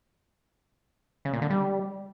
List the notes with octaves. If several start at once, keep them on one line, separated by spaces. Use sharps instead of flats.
C#3
A#2
D3
G3